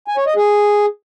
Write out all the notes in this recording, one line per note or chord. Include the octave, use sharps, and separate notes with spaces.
G#5
C#5
D#5
G#4